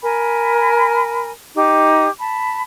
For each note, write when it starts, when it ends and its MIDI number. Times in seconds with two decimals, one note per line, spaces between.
0.03 1.31 70
0.03 1.31 80
0.03 1.31 83
1.55 2.09 63
1.55 2.09 67
1.55 2.09 86
2.19 2.61 81
2.19 2.61 83